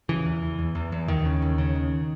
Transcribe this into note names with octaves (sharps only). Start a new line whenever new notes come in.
C#3 E3
E2
E2
E2
E2
E2
D#2 D#3
C#3
D#2
C#3
D#2